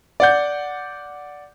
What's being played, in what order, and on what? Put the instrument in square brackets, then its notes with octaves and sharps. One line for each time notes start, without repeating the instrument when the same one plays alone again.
[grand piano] D5 F#5 G6